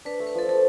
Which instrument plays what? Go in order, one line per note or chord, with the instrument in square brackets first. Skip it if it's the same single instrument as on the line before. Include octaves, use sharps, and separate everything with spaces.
[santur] D4 [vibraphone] B4
[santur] A3
[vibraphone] B4
[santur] F3 [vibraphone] A4
[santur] F3 [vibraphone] A4